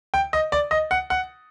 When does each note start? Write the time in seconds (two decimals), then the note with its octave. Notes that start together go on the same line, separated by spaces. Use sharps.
0.14 G5
0.33 D#5
0.52 D5
0.71 D#5
0.91 F#5
1.10 F#5